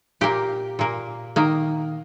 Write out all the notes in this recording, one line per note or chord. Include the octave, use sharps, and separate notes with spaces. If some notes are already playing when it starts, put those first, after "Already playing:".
A#2 A#3 G4
A#2 A#3
D#3 A#3